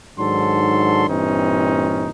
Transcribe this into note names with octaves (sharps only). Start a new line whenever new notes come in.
G#2 D#3 F#3 D4 A4 C6
G2 A#2 E3 C4 C#4 D#4